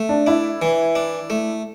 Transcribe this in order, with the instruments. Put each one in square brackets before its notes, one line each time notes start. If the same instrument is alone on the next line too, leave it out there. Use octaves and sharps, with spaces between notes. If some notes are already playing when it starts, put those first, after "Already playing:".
Already playing: [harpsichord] A3
[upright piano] D4
[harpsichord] D4 [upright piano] E4
[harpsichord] E3
D4
A3